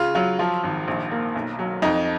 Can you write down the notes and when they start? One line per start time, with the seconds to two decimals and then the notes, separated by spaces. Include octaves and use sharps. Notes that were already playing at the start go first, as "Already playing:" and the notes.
Already playing: C#3 F4
0.15 F#3 F4
0.39 F3 F4
0.63 G#1
0.88 A#1
1.11 A#3
1.35 B1
1.59 F#3
1.82 F2 D#4